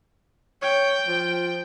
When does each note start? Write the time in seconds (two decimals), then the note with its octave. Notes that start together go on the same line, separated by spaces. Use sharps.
0.62 C#5 G5
1.08 F3